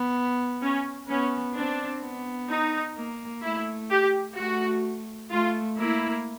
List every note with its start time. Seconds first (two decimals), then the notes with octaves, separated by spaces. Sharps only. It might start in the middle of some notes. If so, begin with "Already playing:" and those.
Already playing: B3
0.62 C#4
1.09 B3 C#4
1.55 C4 D4
2.03 B3
2.50 D#4
2.97 A#3
3.43 A3 E4
3.91 G4
4.37 A3 F#4
5.31 A3 F4
5.78 A#3 E4